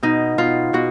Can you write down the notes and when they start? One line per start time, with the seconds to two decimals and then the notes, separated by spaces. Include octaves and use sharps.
0.03 B2 D#4
0.38 B2 F4
0.73 B2 F#4